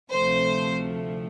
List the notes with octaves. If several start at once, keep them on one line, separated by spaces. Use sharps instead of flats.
D2 C3 F3 A3 C5